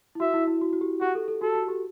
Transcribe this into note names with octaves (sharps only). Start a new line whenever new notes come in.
E4
F#4 E5
E4
E4
F#4
F#4
G4
F#4 G4
A4
A4
F#4 A4
F#4
G4